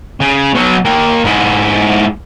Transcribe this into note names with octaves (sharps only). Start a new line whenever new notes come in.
C#3
B2 F#3
A#3 G5
G#2 E4